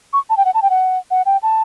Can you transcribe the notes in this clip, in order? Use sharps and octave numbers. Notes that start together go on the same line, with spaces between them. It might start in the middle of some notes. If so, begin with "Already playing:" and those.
C#6
A5
G5
F#5
A5
G5
F#5
F#5
G5
A5